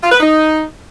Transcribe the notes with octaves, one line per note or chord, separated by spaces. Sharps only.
F4
B4
D#4